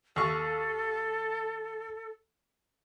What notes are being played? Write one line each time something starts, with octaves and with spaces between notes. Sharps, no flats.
D#2 A4 C#6